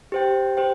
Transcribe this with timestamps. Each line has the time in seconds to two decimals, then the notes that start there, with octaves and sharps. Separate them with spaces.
0.12 G4 C5 G5
0.57 G4 C5 G5